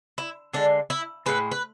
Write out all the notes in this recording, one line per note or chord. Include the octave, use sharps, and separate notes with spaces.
E4
D3 G#3 D4
E4
A2 G#3 B4
B4